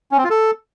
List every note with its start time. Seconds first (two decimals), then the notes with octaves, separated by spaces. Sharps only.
0.11 C#4
0.18 C4
0.24 F4
0.30 A4